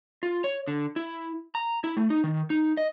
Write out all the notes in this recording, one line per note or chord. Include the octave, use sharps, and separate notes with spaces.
F4
C#5
D3
E4
A#5
E4
A3
D#4
D#3
D#4
D#5